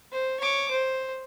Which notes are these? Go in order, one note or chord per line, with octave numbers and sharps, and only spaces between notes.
C5
C#5 D6
C5